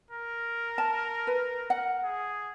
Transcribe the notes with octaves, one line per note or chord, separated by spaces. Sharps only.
A#4
A5
B4
F#5
G#4